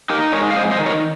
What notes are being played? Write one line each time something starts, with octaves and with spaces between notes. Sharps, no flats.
D#4 G4 A#4
G#3 A#4 C#5
F5
F2 C5 D#5
C5 D#5
D#3
A#4 C#5